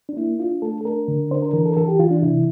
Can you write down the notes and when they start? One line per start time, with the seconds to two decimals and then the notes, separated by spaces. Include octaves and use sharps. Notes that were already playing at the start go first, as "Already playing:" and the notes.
0.09 D4
0.17 A#3 E4
0.39 D4 F4
0.62 A3 A4
0.81 A4
0.85 D4 A#4
1.08 D3
1.31 D4 C5
1.42 A#4
1.53 E3 A#4
1.65 A4
1.72 A#4
1.77 E3 A4
1.88 G4
1.99 E3 F4
2.11 D4
2.22 C3 E4